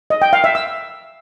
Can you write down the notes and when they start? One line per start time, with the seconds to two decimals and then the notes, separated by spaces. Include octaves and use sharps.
0.10 D#5
0.22 G5
0.33 F5
0.44 E5
0.55 E6